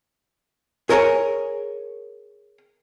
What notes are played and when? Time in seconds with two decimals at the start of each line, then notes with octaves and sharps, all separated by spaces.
0.89 G#4 A#4 C#5 E5 G#5